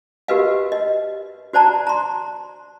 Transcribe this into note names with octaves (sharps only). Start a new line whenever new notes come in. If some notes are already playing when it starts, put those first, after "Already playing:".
F#4 G4 A#4 B4 D#5 F5
D#5
F#4 C5 D5 A5 A#5
A#5 C6